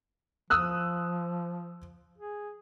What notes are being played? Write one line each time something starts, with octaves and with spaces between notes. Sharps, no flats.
F3 D#6 E6 F#6
G#4